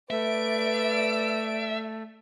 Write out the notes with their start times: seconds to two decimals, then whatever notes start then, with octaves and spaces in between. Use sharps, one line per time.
0.10 A3 B4 D5 E5 D7